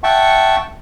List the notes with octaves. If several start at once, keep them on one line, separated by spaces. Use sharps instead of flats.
E5 F#5 G5 A5 C#6